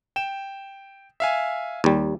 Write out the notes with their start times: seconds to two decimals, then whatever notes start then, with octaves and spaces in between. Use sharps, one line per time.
0.16 G5 E7
1.20 E5 F5 G#5
1.84 D#2 G3